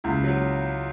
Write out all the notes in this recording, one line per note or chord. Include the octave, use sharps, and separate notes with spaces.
C#2 E4
F#3